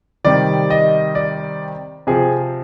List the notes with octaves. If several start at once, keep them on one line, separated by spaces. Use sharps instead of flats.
C3 D#3 G3 D5
D#5
D5
C3 F3 G#4